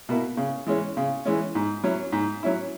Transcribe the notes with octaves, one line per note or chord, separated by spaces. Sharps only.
B2 A#3 E4
C#3
E3 G#3 C#4
C#3
E3 G#3 C#4
G#2
F#3 C#4 E4
G#2
F#3 C#4 E4